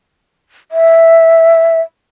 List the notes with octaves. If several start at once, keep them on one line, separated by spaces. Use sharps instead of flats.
E5